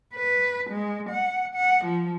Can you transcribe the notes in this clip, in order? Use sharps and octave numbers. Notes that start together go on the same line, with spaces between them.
B4
G#3
F#5
F#5
F3